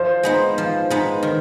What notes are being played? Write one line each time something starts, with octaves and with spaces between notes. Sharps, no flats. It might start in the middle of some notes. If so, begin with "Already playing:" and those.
Already playing: F3 C5
G#3 B3 D#4
F3
G#3 B3 D#4
D#3